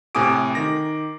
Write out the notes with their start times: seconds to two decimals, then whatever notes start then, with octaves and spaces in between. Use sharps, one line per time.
0.15 A2 C3 G#5 D6 D#6 D7
0.55 D#3 D6 A#6